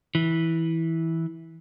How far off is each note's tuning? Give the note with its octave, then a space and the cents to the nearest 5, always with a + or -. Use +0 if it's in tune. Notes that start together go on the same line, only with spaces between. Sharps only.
E3 -15